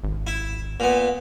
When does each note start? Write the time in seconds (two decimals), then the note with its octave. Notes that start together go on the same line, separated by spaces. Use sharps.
0.04 G#1
0.27 E4
0.80 A#2 B3